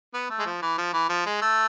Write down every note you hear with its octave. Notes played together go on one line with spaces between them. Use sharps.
B3
A3
G#3
F3
E3
F3
E3
F3
G#3
A3